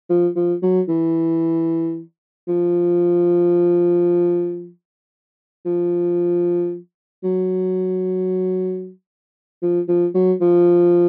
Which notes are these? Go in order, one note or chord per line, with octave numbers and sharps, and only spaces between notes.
F3
F3
F#3
E3
F3
F3
F#3
F3
F3
F#3
F3